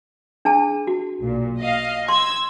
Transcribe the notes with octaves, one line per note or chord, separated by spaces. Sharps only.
D4 G#4 A5
F#4
B1 A#2
D#5 F5
C6 E6 G#6